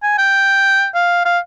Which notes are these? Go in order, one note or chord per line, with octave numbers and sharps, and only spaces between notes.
G#5
G5
F5
F5